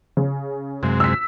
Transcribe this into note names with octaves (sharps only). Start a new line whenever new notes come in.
C#3
F#2 C3 G#3
E6 B6